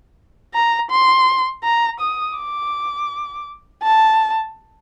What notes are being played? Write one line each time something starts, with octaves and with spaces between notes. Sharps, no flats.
A#5
C6
A#5
D#6
D6
A5